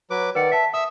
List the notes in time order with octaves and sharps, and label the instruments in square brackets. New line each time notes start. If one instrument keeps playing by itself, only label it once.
[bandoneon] F#3 B4 D6
[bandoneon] D#3 D5 [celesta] B4 F#5 C#7
[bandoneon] E5 [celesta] A5 B6
[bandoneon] E5 E6 [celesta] D#6